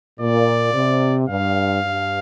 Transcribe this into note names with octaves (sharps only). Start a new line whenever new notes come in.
A#2 D5
C3
G2 F5
G2